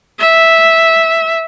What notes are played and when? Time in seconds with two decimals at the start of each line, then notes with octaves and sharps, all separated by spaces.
0.19 E5